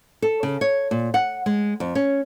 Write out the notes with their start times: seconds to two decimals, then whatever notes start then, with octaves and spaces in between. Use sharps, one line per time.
0.22 A4
0.43 C#3
0.61 C#5
0.91 A#2
1.14 F#5
1.46 G#3
1.80 F2
1.95 C#4